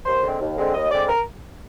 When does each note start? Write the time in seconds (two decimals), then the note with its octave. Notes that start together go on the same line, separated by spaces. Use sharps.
0.05 D#2 C5
0.22 D3 G#3 C4
0.39 D#2
0.57 D3 G#3 C4
0.74 D#2 D#5
0.91 D3 G#3 C4 D5
1.08 A#4